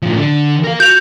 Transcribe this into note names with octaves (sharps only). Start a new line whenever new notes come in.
A2 F3
D3
A#4 F5
F#4 G6 F7